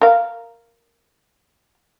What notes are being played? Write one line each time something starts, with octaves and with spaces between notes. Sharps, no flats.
A#4 F5